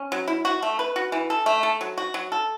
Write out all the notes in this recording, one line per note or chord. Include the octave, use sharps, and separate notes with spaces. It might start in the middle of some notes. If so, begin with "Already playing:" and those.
Already playing: C#4
F#3
E4
F#4
A3
B4
F#4
E3
A4
A3
A4
F#3
F#4
F#3
A4